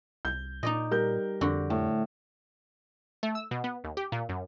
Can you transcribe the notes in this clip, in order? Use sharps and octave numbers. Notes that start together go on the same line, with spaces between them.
C2 G6
A#2 D#4 D5 D#5
G3 A#4 G6
F2 D3 F#4
A2
A3
E6
B2
B3
D#2
G4
A#2
F#2